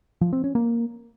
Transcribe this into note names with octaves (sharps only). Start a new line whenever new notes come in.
F3
C4
C#4
A#3